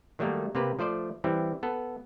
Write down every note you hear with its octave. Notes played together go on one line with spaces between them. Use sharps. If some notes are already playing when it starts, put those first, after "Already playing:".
D#3 F#3 G3 A3 A#3
C3 A#3 C4 G4 B4
F3 A3 C5 D5
E3 G3 C4 E4
B3 A4